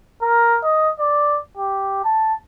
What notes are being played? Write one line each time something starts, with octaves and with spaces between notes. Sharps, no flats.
A#4
D#5
D5
G4
A5